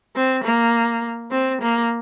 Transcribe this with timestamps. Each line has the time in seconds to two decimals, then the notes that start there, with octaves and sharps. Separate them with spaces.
0.16 C4
0.44 A#3
1.31 C4
1.61 A#3